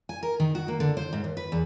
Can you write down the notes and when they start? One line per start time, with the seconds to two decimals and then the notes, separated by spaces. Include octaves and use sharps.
0.09 G#5
0.23 A#4
0.40 D#3
0.55 F#4
0.68 A#3
0.80 D3
0.97 C5
1.13 G#2
1.24 D#2
1.37 B4
1.52 E2